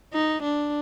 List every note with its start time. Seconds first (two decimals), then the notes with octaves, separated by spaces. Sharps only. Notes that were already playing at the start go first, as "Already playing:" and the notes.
0.13 D#4
0.43 D4